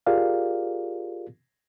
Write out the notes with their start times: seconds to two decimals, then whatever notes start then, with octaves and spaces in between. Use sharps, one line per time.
0.07 F4 G4 G#4 A#4 D5 F5